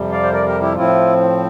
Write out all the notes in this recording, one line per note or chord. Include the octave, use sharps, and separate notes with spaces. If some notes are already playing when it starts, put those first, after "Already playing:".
Already playing: F2 C3 G3
D5 F5
C5
A#4 D5
G4 A#4
E4 G4
A2 F3 C4 E4 F4